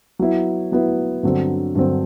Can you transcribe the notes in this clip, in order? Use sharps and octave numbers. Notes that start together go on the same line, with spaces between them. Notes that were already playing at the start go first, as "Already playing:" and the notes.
F#3 B3 E4
F#3 B3 E4
G2 D3 F#3 C4
G2 D3 F#3 C4